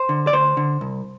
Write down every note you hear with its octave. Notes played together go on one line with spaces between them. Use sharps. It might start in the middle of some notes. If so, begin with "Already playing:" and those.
Already playing: C5
D3
D5
D2 C5
D3
C2